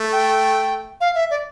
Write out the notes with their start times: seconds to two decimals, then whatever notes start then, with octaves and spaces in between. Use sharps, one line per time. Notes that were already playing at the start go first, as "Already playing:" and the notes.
Already playing: A3
0.12 G5
1.01 F5
1.15 E5
1.30 D5